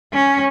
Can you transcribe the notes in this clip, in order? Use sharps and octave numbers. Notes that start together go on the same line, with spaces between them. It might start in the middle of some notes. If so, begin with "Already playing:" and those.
C#4